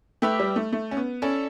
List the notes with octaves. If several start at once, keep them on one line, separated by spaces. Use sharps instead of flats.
A3 G4 B4 E5 G5
G3
A3
A3
C#4
B3
C#4 E4 A4 D5